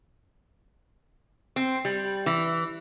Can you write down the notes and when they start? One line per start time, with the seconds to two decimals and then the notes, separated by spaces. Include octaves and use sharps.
1.56 C4
1.85 G3
2.26 E3